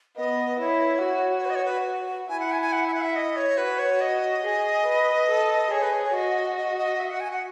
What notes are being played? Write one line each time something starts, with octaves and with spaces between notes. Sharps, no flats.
B3 D#5
E4 C#5
F#4
C#5
B4
D#5
C#5
B4
E4 G#5
F#5
G#5
G#5
F#5
E5
F#5
E5
D#5
C#5
F#4 B4
C#5
D#5
G#4
B4
A4
G#4 C#5
B4
C#5
C#5
F#4 D#5
D#5
D#5
E5
F#5
G#5
F#5